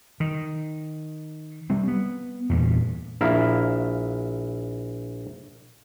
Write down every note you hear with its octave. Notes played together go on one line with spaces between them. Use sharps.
D#3
G3 C4
B3
E2 G2 A#2
A#1 E4 F5 A#5